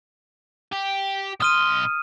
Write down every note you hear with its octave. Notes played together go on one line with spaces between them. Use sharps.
G4
B1 C6 D#6 F6 D#7